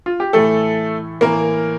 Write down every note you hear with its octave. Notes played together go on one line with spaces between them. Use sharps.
F4
G4
A2 E3 A3 A4
A2 E3 A#3 A#4